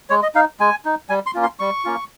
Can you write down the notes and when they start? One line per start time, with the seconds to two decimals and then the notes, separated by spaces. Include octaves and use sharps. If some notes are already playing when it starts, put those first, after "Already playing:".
0.10 G#3 C#5
0.23 D#5
0.35 D#4 F5
0.60 G#3 G#5
0.85 D#4
1.09 G3 G#5
1.26 C6
1.35 A#3 C#4 F4
1.43 C6
1.59 G3 C#6
1.85 A#3 C#4 F4